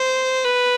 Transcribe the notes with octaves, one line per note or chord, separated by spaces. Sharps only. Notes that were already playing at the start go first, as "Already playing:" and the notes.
Already playing: C5
B4